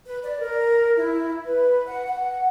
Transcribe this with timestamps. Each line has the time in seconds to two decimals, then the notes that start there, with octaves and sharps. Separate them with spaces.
0.06 B4
0.24 D5
0.40 A#4
0.96 E4
1.46 B4
1.88 F#5
2.08 F#5